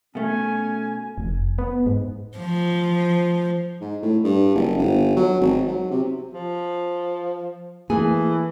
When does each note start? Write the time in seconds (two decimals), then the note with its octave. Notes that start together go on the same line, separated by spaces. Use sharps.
0.15 B2 A3 C#4 G#5
1.18 F1
1.58 B3
1.86 G#2
2.38 F3
3.81 G#2
4.02 A2
4.24 G2
4.55 F#1
4.78 G1
5.16 F#3
5.41 G#1
5.67 F#3
5.90 C3
6.33 F3
7.90 E3 A3 A#3 G#4 G#5